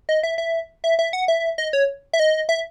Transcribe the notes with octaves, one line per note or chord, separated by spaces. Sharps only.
D#5
E5
E5
E5
E5
F#5
E5
D#5
C#5
E5
D#5
E5